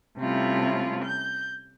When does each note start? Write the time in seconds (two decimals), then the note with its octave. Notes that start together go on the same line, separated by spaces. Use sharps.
0.18 C3 G3 A3 C#4 E4 F4
1.05 G6